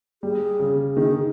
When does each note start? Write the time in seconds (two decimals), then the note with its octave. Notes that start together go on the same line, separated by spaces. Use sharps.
0.23 G3 G#4
0.60 C#3
0.96 D#3 G#4